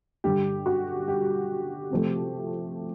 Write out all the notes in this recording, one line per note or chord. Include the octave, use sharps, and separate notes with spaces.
G2 D3 G3 G4
F#4
G4
C3 F3 A3